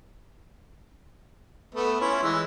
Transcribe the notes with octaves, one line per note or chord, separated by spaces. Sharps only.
A3 B3 E5
C#4 E4 F4
E3 G#3 E6